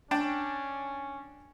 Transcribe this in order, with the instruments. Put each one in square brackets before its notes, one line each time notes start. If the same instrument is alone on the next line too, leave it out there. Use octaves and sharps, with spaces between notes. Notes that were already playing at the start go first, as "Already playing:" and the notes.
[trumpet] C#4 [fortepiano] D4 G5 A5